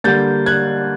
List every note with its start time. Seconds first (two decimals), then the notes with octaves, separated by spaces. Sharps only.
0.04 D3 G3 A#3 G6 A6
0.46 F#6 G#6